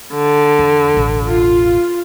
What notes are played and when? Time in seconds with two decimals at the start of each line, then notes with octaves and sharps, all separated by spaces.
0.14 D3
0.59 E2
0.94 E1 A1
1.26 F4